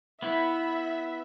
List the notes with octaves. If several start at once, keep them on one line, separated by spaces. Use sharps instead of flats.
B3 E4 E5